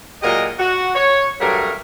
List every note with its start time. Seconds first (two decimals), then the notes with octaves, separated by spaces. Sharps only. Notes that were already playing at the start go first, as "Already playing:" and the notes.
0.22 A#2 F#3 G#3 G4 A#4 D#5
0.59 F#4
0.95 C#5
1.40 G2 F#3 A3 A#4